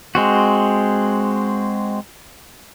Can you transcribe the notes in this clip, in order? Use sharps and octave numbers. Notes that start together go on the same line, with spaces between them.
G#3 C4 F#4